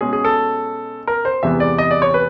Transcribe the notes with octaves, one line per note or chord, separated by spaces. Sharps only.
B2 G#3 C#4 G#4
G#4
A4
A#4
C5
E2 C3 E3 G#3 B3 E5
D5
D#5
D5
C#5
B4